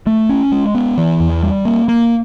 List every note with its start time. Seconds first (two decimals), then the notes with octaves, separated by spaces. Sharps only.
0.07 A3
0.29 C#4
0.52 G#3
0.75 B3
0.98 E3
1.20 E2
1.43 G3
1.65 A#3
1.88 A#3